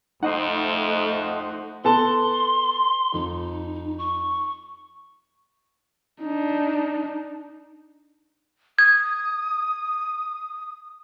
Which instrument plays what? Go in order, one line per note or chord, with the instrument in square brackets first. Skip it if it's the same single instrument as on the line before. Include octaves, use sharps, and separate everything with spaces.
[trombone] F2 [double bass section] A3 [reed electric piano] D#4 [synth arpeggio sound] C5 D#5 F#5
[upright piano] B3 A4 A5 [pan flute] C6
[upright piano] F2 [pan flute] D#4
[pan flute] C#6
[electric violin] D4 D#4
[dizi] D#6 [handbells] G#6